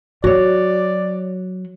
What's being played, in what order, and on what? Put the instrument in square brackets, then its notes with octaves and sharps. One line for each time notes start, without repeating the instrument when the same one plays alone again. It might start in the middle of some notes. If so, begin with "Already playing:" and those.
[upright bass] F#3 [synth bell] F#4 C#5 [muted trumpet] D5